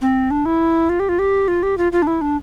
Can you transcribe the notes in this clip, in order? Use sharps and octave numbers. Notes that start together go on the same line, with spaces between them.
C4
D4
E4
F4
G4
F4
G4
F4
G4
F4
F4
D4
E4
D4